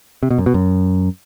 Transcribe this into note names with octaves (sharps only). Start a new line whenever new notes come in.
C3
B2
F#2
B2
F#2